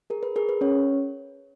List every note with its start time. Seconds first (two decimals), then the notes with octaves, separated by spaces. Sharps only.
0.10 G#4 A#4
0.23 B4
0.36 G#4 A#4
0.49 B4
0.61 C#4 C#5